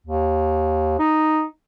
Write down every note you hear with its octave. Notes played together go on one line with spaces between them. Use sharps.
D#2
D#4